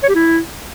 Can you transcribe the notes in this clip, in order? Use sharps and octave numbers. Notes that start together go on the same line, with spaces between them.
C#5
G4
E4